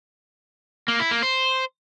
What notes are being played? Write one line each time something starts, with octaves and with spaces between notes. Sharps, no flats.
A#3
E4
A#3
C5